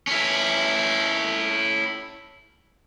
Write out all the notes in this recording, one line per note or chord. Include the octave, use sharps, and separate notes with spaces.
C#4 E4